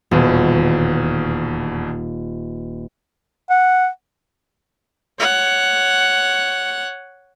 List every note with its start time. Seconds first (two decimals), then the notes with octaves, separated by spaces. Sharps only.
0.11 D#1 E2 B2
3.50 F#5
5.19 C#5 F#5